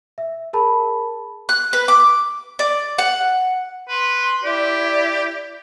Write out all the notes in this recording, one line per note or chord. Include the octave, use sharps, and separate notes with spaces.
E5
G#4 A#4 A5 B5
F#6
B4
D6
D5
F#5
B4 C6
E4 G4 D5